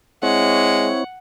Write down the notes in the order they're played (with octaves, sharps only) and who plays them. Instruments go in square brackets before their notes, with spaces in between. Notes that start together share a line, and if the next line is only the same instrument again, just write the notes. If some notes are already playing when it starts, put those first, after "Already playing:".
[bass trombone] G#3 [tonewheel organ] C4 E4 C#5 [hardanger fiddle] F#5